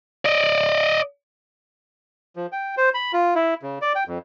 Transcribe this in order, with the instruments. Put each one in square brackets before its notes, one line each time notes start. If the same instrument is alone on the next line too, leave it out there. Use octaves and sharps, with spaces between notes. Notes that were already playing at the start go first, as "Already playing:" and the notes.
[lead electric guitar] D5 D#5
[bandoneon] F3
G5
C5
B5
F4
E4
C#3
D5
G5
F2